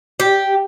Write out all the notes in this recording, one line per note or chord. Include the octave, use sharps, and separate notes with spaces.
G4